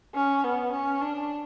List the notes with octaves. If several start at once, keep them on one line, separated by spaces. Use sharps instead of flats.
C#4
B3
C#4
D4